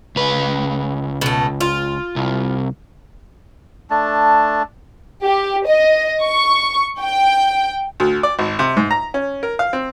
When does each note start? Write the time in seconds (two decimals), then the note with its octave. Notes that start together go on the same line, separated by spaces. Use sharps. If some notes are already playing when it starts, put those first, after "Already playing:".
0.16 C#2 B4
1.21 B2 A3
1.61 F4
2.16 C2
3.90 A3 D4 A5
5.25 G4
5.67 D#5
6.24 C#6
7.02 G5
8.00 D2
8.23 D5
8.39 G#1
8.59 C3
8.77 G#2
8.91 A#5
9.14 C#4
9.43 A#4
9.59 F5
9.73 C4